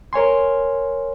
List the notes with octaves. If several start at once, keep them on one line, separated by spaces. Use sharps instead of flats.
A#4 C#5 G#5 C6